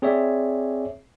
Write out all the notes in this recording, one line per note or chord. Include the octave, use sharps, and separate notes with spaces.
C4 G#4 C#5 D5 E5